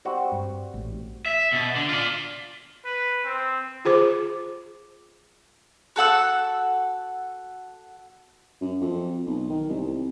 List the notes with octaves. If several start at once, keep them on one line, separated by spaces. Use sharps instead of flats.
G3 C4 F#4
G2
A1 A2
E5
B2
D3
F4 D5
B4
C4
F4 G#4 C5 D6
F#4 A4 F#5 E6
F#2
F2
B1
D#3
C2